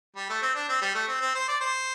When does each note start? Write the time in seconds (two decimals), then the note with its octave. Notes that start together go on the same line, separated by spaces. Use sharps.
0.16 G3
0.29 A3
0.42 C4
0.55 D4
0.69 C4
0.81 G3
0.95 A3
1.08 C4
1.21 C4
1.35 C5
1.48 D5
1.61 C5